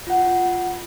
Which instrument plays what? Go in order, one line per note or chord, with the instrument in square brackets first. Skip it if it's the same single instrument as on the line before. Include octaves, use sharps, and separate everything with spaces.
[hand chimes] F4 F#5